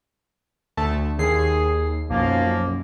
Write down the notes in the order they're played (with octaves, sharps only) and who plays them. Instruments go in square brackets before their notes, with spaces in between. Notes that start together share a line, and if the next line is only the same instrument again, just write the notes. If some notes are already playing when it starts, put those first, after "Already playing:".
[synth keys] D2 A3 A5
[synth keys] D#2 C7 [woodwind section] G#4
[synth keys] B1 F#2 [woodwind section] F3 A#3